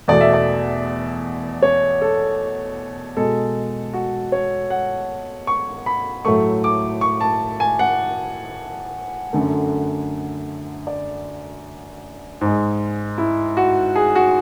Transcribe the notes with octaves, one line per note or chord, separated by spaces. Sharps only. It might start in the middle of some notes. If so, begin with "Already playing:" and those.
E2 B2 A3 D5
E5
D5
C#5
A4
B2 G#3 A4
F#4
C#5
F#5
C#6
B5
A2 F#3 A3 C#6
D6
C#6
A5
G#5
F#5
F#2 D3 A3
D5
G#2 G#3
E4
F#4
G#4
F#4